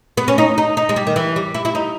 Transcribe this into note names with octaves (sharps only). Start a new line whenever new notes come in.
B3
C#4
D#4
D#4
D#4
G#3
G3
D#3
E3
G3
E4
E4
D#4